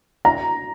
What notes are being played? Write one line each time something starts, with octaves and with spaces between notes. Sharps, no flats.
A#5